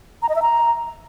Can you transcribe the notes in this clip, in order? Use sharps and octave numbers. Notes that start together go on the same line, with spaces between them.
A#5
D#5
E5
A#5